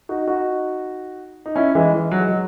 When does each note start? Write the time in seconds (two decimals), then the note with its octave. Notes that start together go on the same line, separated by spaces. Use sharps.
0.09 D#4 F#4
0.28 D#4 F#4
1.46 D#4
1.56 C#4 E4
1.75 E3 G#3
1.93 E3
2.11 F#3
2.19 G#3
2.29 F#3